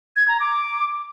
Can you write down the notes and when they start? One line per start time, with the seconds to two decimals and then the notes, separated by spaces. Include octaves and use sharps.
0.16 G#6
0.28 A#5
0.40 D6